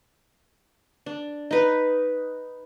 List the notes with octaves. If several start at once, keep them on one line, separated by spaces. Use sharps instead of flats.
D4
D#4 B4